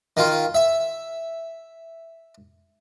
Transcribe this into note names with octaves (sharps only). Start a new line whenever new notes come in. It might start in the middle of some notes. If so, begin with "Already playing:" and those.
D#3 F4
E5